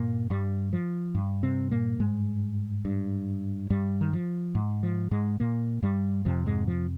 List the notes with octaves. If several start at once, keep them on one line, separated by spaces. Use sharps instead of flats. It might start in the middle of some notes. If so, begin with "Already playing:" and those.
Already playing: G2 A#2 A#3
G2 G3
F3
G2
C3 C4
A#2 A#3
G#2 G#3
G2
G2 G3
D#3
F3
G#2
F3
G#2 G#3
A#2 A#3
G2 G3
F2 C3 F3
G#2 G#3
F3